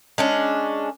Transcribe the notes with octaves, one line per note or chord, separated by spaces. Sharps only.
G#3 C#4 D4